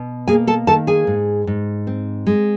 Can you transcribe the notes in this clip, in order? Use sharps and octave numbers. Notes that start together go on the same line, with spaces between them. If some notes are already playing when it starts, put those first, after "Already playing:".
Already playing: B2
A#3 G#4 G#5
A4 A5
D#3 A4 A5
G#4 G#5
G#2
G#2
C4
G#3